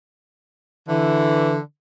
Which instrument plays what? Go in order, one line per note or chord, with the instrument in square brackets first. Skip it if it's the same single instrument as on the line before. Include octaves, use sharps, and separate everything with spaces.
[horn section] D3 E3